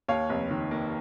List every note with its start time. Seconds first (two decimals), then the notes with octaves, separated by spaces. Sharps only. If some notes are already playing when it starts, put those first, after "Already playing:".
0.09 D#2 C#5 F5
0.30 F1
0.51 D#3
0.71 A#3